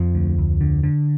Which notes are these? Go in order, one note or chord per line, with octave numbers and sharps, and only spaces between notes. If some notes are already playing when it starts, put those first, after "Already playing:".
Already playing: F2 F3
D2
D2
D3
D3